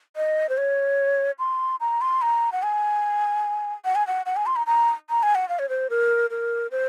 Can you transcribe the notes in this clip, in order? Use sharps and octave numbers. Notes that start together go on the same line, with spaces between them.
D#5
C5
C#5
C6
A#5
C6
A#5
F#5
G#5
F#5
G#5
F#5
F#5
G#5
C6
A#5
A#5
A#5
G#5
F#5
F5
C#5
C5
A#4
A#4
C5